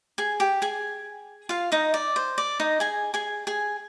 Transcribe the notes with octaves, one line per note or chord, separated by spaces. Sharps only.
G#4 G#5
G4 G5
G#4 G#5
F4 F5
D#4 D#5
D5
C5
D5
D#4 D#5
G#4 G#5
G#4 G#5
G#4 G#5